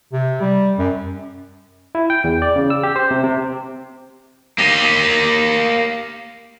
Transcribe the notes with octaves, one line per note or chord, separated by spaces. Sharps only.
C3
G3
F#2
E4
G5
E2
D5
C#3
E6
G4
C5
C3
C3
A#3 G4